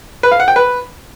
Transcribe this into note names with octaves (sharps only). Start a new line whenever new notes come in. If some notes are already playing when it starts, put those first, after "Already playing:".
B4
F5
F#5
G5
B4